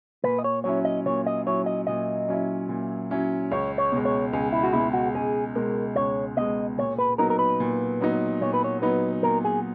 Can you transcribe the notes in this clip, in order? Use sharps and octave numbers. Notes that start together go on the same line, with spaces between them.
A#2 B4
D#5
C#5
F#3 C#4 E4 C#5
D#5
A#2 C#5
D#5
F#3 C#4 E4 C#5
D#5
A#2 D#5
F#3 C#4 E4
A#2
F#3 C#4 E4
C#2 C#5
C#5
B2 G#3
C#5
C#2 G#4
E4
F#4
B2 G#3 E4
F#4
C#2 G#4
B2 G#3 A#4
C#2 C#5
B2 G#3 D#5
A#2 C#5
B4
F#3 B3 D#4 A#4
A#4
B4
A#2
F#3 B3 D#4
A#2 C#5
B4
C#5
F#3 B3 D#4 B4
A#2 A#4
G#4